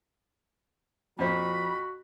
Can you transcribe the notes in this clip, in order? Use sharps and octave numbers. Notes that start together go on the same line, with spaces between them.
F2 A#2 F3 F#4 C5 B5